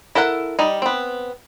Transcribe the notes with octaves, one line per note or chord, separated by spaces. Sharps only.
E4 A4 A#4 F#5
G3 D#4
B3 C4